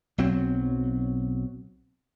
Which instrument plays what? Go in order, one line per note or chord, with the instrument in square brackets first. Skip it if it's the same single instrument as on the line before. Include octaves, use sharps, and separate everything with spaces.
[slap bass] B1 F#3 C4